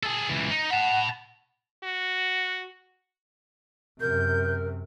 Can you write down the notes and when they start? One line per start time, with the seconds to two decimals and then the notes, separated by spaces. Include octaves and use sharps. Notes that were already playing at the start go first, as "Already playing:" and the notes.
0.03 G#4 A4
0.29 C#2 E3
0.50 D#4
0.71 F#5 A5 B5
1.84 F#4
4.01 F#2 C3 A#4 G6